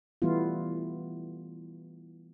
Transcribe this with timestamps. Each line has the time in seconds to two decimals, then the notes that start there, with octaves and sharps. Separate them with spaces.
0.22 E3 G3 A3 B3 E4 F4